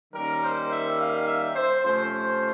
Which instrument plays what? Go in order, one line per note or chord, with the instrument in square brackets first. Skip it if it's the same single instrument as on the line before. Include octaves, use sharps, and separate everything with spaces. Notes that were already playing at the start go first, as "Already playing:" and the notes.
[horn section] D#3 G3 A#3 C#4 A#4
C5
E5
F5
E5
C5
C3 F3 A3 C#4 C5